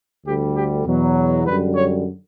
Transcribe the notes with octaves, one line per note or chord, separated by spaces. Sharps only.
D2 D3 G3 G4
G4
E2 B2 F#3
F#2 D3 G3 B4
C#5